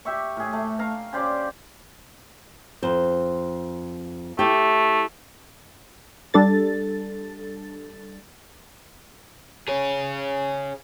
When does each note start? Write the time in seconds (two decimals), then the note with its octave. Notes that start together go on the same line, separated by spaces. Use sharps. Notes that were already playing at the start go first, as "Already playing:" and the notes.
0.05 G4 E5 C#6
0.36 A2 G#4
0.53 A3
0.79 F5 A#5 C#6
1.13 C#3 G4 C5 D5
2.83 F2 C5
4.39 A3 E4 G4
6.34 G3 D4 A4 A6
9.68 G#4 C#5